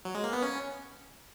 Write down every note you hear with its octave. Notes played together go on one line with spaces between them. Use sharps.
F#3
G#3
A#3
B3
C#4